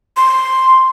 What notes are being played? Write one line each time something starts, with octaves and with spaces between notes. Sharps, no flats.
C6